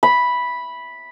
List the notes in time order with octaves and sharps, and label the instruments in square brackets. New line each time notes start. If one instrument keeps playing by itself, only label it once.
[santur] B5